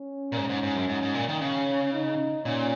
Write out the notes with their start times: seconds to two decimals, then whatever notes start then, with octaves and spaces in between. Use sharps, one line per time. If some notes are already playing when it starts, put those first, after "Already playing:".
Already playing: C#4
0.32 A#2
0.37 G#2
0.49 G#2
0.63 G#2
0.75 F#2
0.89 G#2
1.02 G#2
1.15 A#2
1.29 D#3
1.41 C#3 C#4
1.93 D#4
2.45 A#2 C#4